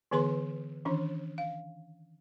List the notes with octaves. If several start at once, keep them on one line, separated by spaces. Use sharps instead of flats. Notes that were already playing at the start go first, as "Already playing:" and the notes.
D3 E3 B3 G#4 B4 C6
D#3 E3 C#4 D4
F5